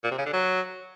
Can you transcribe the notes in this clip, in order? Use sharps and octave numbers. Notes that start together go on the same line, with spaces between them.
A#2
C3
C#3
D3
F#3